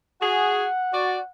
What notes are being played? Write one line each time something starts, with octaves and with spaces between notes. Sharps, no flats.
F#4 G#4 F#5
F#4 D5